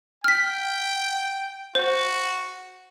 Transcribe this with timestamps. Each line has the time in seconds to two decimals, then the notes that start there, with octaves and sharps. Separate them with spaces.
0.24 G5 F6 B6
1.75 F#4 C5